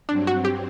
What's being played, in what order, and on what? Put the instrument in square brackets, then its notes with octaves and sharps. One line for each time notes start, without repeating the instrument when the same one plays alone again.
[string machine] G2 F#3 C4 [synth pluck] D4
[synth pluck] F#4
G4